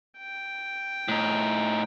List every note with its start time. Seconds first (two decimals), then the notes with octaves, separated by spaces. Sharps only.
0.19 G5
1.08 A2 D#4